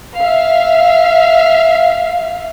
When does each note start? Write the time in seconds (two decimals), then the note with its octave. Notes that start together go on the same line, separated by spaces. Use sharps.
0.19 E5 F5